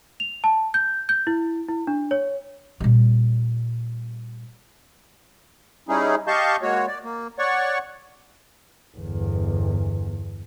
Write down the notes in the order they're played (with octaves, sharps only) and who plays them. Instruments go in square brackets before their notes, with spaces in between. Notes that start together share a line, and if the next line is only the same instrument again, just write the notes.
[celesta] F7
A5
G6
G6
E4
E4
D4
C#5
[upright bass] A#2 G3
[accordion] G3 C#4 D#4 E4 G#4
G4 D#5 F5 A5 C#6 G6
G#3 A#3 F#4 C#5
D5
A#3
C#5 D5 F#5 C#6
[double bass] G1 E2